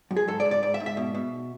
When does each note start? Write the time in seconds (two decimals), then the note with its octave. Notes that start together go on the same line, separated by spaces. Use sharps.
0.11 F#2
0.17 G#4
0.28 G#2 A4
0.40 D5
0.45 G#2
0.51 D5
0.63 G#2 D5
0.74 E5
0.80 G#2
0.86 E5
0.97 B2
1.14 B2